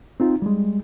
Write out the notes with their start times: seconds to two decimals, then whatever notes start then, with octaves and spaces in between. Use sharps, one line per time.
0.20 C4 D#4 F4
0.42 G3 G#3